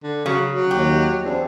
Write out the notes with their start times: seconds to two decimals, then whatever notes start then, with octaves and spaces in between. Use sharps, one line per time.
0.03 D3
0.26 C#3 F#3
0.54 F#3
0.71 D#2 G4
1.23 E2 C#3 C4 D4